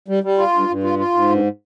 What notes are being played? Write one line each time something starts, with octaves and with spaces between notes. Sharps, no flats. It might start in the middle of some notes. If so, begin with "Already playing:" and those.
G3
G3
F4
G2
G2
F4
F4
G#2
G2